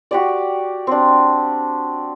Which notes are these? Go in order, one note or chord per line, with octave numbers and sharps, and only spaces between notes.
F#4 G4 D5
C4 D4